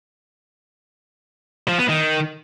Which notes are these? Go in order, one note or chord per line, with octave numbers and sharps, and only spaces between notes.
F3
B3
D#3